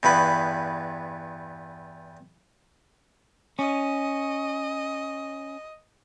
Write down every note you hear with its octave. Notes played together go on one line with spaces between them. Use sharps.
E2 G2 B3 B5
C#4 D#5